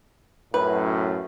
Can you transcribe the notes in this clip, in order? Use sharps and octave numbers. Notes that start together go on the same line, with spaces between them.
F#2 A2 B4